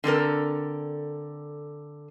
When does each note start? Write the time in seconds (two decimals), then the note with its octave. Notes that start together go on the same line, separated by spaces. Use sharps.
0.04 D3 C4 A4 A#4